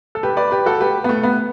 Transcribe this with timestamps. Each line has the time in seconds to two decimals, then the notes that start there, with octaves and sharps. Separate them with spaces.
0.15 A4
0.23 G4 B4
0.37 B4 D5
0.51 G4 B4
0.66 F#4 A4
0.80 G4 B4
1.04 B3
1.09 A3
1.23 B3